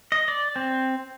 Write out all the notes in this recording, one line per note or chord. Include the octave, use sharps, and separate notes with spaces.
D#5
D5
C4